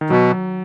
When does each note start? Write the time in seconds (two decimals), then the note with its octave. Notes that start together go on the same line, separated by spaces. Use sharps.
0.01 D#3
0.10 B2 F#3